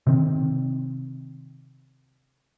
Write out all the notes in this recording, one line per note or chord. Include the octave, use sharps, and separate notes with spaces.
C3 D#3 C4